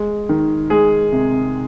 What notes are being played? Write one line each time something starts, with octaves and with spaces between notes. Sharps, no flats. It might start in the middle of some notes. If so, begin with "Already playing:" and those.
Already playing: G#3
D#3
G#3 G#4
C3